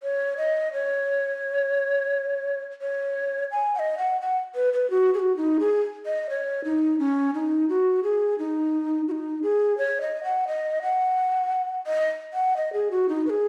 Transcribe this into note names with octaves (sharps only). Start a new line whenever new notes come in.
C#5
D#5
C#5
C#5
G#5
F#5
D#5
F#5
F#5
B4
B4
F#4
G#4
F#4
D#4
G#4
D#5
C#5
D#4
C#4
D#4
F#4
G#4
D#4
F#4
D#4
G#4
C#5
D#5
F#5
D#5
F#5
D#5
F#5
D#5
G#4
F#4
D#4
B4
G#4